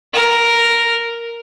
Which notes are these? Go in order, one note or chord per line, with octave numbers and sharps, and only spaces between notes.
A#4